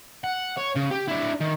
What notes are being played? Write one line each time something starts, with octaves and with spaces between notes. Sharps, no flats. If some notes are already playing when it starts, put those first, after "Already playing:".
F#5
C#5
C#3
G4
D4 E4
D#3